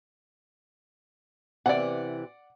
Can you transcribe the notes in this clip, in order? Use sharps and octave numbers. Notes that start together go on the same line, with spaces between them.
C3 E3 D5 F#5